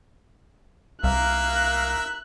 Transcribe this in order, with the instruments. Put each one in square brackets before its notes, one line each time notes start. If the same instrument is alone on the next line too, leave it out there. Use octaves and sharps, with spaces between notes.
[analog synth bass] C2 [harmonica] A#3 A#4 E5 [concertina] F5 [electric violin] F#6